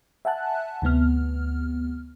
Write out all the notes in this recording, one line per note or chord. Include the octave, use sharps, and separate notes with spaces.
E5 F#5 G#5 A5 F#6
D2 C3 B3 F6